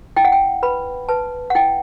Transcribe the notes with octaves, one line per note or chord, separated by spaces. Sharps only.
E4 G5
F#5
G5
B4 B5
B4 A5
F#5
E4 G5